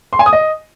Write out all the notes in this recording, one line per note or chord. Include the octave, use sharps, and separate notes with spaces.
C6
G#5
D#6
D#5